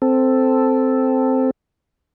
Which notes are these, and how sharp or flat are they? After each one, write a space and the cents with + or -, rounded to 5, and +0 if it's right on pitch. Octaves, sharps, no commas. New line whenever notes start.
C4 -5 A4 +0